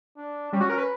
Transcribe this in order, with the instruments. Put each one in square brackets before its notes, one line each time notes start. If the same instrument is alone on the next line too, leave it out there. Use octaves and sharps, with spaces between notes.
[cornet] D4
[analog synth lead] G3 [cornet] C#4
[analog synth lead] F#4
A#4
B4